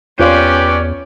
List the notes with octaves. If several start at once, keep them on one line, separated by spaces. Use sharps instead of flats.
E2 C#4 F4 G4 B4 C5 D5 F5